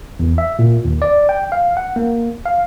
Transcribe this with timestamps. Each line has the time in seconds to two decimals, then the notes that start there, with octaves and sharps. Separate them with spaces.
0.19 E2
0.38 E5
0.59 A#2
0.85 D#2
1.02 D5
1.29 G5
1.52 F5
1.77 F#5
1.96 A#3
2.46 F5